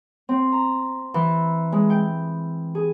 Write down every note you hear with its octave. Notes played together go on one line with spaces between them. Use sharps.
C4
A#5
E3
G#3
G5
G#4